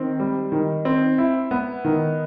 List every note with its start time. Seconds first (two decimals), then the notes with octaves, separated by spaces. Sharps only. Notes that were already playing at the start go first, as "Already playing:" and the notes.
Already playing: D#3 C4
0.20 G3
0.52 D#3
0.85 C4
1.18 E4
1.51 B3
1.85 D#3